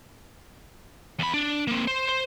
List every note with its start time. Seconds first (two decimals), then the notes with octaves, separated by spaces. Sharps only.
1.19 E2 B5
1.34 D4
1.67 A#3 C4
1.87 C5
2.09 C5